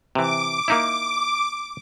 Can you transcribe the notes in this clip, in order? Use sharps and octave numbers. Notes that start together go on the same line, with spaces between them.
C3 E3 D6
A#3 D#4 E4